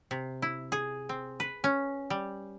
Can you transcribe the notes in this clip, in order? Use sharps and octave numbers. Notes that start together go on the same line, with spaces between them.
C3
E4
G#4
C4
B4
C#4
G3